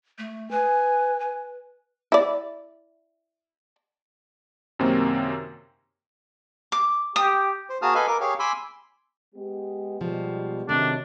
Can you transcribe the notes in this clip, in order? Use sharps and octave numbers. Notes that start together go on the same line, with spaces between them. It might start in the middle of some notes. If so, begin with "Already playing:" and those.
A3
B4 G#5
B4
E4 D5
F#2 C3 D#3 A#3 C4
D6
G4 D#6
C5
A#3 F#4 G#4 A5 D#6 F6
A4 B4 D#5 F5 G#5
A#4 D6
G4 G#4 C#5 F5
G#5 B5 C6 D6 E6
G#3 B3 G4
B2 F3 G3 G#3 B3
C3 D#3 F#3 A3 D4 D#4